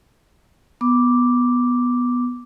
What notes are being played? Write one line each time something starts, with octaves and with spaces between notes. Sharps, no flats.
B3 D6